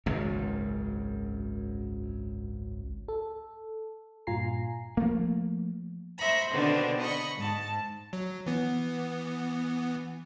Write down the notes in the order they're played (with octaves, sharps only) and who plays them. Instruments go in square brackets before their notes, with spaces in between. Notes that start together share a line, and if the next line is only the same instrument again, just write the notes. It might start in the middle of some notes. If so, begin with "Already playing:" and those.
[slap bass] G#1 C#2 F#2
[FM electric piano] A4
G2 A#2 F4 G#5 A#5 C7
[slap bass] F3 A3 A#3
[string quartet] C5 E5 A#5 B5 C#6
B2 D3 D#3 B3 C4 D4
D#5 B5 C#6
G#2 A5
[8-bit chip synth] F#3
E3 B3